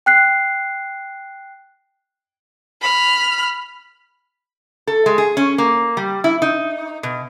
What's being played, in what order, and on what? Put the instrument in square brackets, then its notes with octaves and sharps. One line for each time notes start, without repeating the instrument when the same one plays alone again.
[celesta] G5 F#6 C7
[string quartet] B5 F6
[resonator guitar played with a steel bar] A4
G#3
G#4
C#4
A#3
G3
E4
D#4
B2